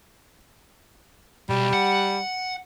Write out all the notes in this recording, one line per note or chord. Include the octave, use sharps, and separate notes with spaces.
B1 G3
F#5